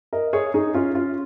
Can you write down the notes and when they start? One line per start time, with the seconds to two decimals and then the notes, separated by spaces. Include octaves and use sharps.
0.13 A#4 D#5
0.33 G#4 C#5
0.54 D#4 G#4
0.74 C#4 F4
0.95 C#4 F4